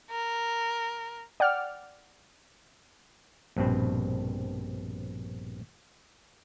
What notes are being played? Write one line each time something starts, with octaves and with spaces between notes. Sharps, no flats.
A#4
D5 F#5 G5 F6
A#1 G2 B2 C4